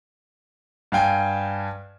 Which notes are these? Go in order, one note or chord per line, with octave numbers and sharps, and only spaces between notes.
G2 F5 G5 G#5